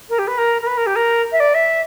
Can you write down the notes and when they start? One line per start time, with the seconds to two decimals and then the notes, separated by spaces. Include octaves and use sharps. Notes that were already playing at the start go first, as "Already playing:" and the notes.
0.09 A#4
0.18 G4
0.27 B4
0.37 A#4
0.61 A#4
0.66 B4
0.77 A#4
0.86 G4
0.95 A#4
1.31 E5
1.39 D5
1.54 E5